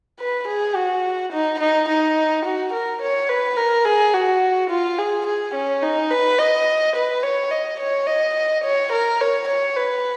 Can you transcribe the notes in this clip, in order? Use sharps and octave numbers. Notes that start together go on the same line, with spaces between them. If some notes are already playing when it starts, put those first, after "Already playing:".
B4
G#4
F#4
D#4
D#4
D#4
F#4
A#4
C#5
B4
A#4
G#4
F#4
F4
G#4
G#4
C#4
D#4
B4
D#5
B4
C#5
D#5
C#5
D#5
C#5
A#4
C#5
C#5
B4